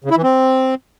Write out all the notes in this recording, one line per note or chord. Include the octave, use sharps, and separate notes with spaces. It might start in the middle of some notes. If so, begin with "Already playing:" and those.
C#3
E4
E3
C4